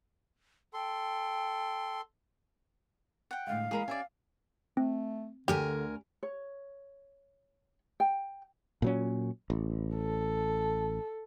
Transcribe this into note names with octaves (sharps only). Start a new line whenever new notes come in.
A4 G5 C6
F#5 G5
A2 D3 G#3 F5
E3 G#3 A#3 G#4 A#4 B5
C#4 G4 D5 E5 G#5
A3 C4
D2 D3 G4 A#4 G#5
C#5
G5
A#2 F#3 C#4
A1
A4